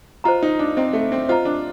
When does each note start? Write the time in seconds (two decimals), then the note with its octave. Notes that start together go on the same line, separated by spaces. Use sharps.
0.24 F4 C5 D#5 A#5
0.43 D#4
0.59 D4
0.77 C4 C5 D#5 A#5
0.93 A3
1.12 C4
1.29 F4 C5 D#5 A#5
1.45 D4